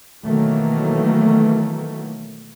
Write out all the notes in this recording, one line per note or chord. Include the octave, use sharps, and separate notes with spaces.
B2 D#3 E3 F#3 A3 A#3